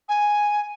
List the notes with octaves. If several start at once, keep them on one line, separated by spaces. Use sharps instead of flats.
G#5